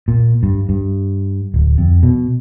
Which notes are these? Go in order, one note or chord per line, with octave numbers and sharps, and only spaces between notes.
A#2
G2
G2
D1
F2
B2